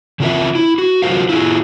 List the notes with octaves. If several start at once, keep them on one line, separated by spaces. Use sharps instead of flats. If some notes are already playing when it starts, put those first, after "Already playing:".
C#3 C4 F4 A#4 E5
E4
F#4
F#3 F4 F#4 A#4 C5 F5
E4 F4 G#4